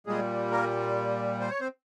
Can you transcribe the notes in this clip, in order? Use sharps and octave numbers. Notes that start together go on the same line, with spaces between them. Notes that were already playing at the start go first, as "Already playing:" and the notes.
A#2 G3 G#3 G#4
A#3 A#4
C5
C#5
C4 C5